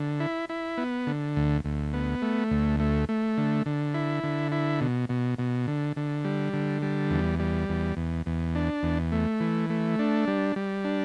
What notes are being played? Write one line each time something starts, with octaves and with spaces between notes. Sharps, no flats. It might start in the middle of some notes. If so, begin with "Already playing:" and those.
Already playing: D3
E4
E4
B3
D3
D2
D2
B3
A3
D2
A3
A3
D3
D3
E4
D3
E4
B2
B2
B2
D3
D3
G3
D3
G3
E2
G3
E2
E2
E2
D4
E2
A3
E3
A3
D4
G3
G3
D4